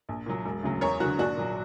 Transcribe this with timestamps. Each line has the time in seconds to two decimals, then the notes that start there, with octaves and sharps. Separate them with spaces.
0.09 A#1
0.26 A#2 F#3
0.45 E1
0.63 D2 C#3 F#3
0.81 E2 A#4 C#5
1.00 D3 F#3 F#4 A#4
1.18 A#1 D4 F#4
1.36 A#2 F#3